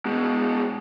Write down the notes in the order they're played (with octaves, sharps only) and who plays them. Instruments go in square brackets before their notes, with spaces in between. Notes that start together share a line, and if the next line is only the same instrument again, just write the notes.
[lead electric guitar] B2 G#3